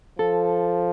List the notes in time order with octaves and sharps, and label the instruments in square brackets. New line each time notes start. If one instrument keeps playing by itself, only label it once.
[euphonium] F3 [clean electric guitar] A4